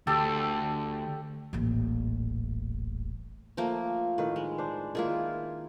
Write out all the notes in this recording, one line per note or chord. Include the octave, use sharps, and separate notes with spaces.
D2 G4 A4
D#1 A1
F3 A3 A#3
A2 D#3 B4
G#3
D4 C5
D#3 A#3 E4 F4 G#4